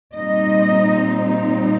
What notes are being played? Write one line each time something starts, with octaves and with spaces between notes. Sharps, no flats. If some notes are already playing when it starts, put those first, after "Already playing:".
A#2 G3 C4 D#4 D#5